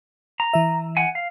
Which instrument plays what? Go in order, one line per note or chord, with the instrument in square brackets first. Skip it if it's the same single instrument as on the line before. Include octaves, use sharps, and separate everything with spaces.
[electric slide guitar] A#5
[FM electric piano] E3 E5
[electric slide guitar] F#5 G#5
F5